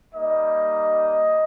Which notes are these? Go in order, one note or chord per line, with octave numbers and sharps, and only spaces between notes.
G3 A#3 D#4 D#5